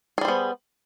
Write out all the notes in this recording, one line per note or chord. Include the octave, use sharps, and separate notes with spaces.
G3 B3 G#4 C5